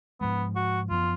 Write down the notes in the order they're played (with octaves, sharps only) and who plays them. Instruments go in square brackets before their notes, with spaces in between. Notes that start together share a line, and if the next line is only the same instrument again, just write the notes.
[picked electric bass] G#2 F3 G#3 [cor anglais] B3
[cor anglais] F#4
[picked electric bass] F#2 F3 B3 [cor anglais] F4